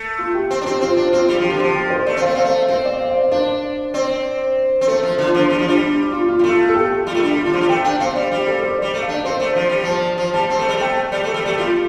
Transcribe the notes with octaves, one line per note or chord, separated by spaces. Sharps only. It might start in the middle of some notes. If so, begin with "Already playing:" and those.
Already playing: A3
F4
G4
C4
D4
C4 G4
C4 F4
D4
C4 F4
G3
F3
G4
D3
F3 G4
G4
C5
A3 D5
C4
A3 F5
C4 F5
A3
C4 C5
D5
F5
F5
D5
D4 C5
C4 D5
C4
A3 A4
F3
D3 F4
F3 D4
G3 D4
F3 F4
G3 D4
D4
F4
F4
G3
A3 F4
A4
G4
G3 F4
A3
G3 D4
F4
D3
F3 F4
G3
A3 G5
D4 G5
C4 F5
G3 D5
G3 G4
A4
C5
G3 D5
A3
F5
D4 D5
C4 C5
A3
F3
G3
F3 A5
F3
G3 A5
C4
A3
G3
A3 G5
G3 D5
A3 A4
G3
A3 G4
G3 F4